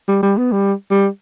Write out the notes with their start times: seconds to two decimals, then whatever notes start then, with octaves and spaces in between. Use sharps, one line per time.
0.08 G3
0.23 G3
0.37 B3
0.52 G3
0.91 G3